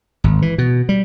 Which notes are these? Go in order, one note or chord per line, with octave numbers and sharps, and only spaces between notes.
G#1
E3
B2
G3